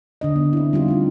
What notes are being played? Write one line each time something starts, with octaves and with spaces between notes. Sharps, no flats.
D3 D4 D#5
B3
C4 E4
G3 D#4 F4 G4
A3 D4